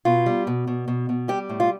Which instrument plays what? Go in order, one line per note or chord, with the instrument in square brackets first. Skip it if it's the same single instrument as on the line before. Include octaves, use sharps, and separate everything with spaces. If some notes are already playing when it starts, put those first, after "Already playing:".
[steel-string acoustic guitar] B2 F4
G3
B2
B2
B2
B2
G3 G4
A2
F4